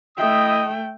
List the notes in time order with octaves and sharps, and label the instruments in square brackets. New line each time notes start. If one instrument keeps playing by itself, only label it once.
[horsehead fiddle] A3 G5 [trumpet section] E4 D#5 D#6